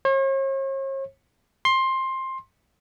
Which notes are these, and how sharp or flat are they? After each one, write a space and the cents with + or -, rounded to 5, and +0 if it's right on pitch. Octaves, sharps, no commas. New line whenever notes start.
C#5 -45
C6 +15